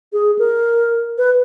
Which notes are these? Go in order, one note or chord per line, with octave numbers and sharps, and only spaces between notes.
G#4
A#4
B4